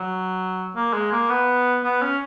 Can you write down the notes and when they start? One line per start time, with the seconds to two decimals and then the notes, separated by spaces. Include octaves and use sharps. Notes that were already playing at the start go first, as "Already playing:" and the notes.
Already playing: F#3
0.76 A#3
0.94 G#3
1.12 A#3
1.29 B3
1.84 B3
2.02 C#4